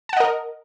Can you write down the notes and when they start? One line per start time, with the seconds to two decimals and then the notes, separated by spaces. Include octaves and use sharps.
0.09 A5
0.13 F#5
0.17 D#5
0.20 A#4